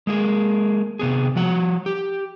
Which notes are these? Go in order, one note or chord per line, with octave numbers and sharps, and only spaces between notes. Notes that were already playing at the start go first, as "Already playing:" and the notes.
G#3 A#3 G#4
C3 B3 G#4
F3 F#4 F#5
G4